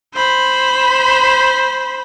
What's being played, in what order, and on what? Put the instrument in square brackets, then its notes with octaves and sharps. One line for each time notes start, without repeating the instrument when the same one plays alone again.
[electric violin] C5 B5